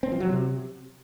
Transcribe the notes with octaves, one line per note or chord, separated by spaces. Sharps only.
C4
F3
F#3
C3